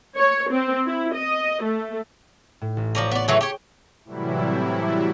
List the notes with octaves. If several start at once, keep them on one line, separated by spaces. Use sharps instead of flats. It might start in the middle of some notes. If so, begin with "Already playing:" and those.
C#5
C4
E4
D#5
A3
A2
A1
F3 C#5 D5 A#5 C#6 D#7
B3 D5
E3 F#3 A3 G#4 G5
G4 C#5
A2 C3 E3 F#3 G3 E4